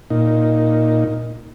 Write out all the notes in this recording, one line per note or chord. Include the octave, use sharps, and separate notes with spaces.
A#2 D#4